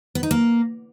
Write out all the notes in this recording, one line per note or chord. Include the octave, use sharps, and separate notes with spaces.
B3
D#4
A#3